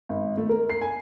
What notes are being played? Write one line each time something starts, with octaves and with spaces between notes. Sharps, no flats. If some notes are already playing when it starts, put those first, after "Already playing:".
G#1
A3
A#4
C7
G#5